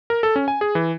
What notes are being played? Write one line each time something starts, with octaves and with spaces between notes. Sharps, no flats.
A#4
A4
C#4
G#5
G#4
E3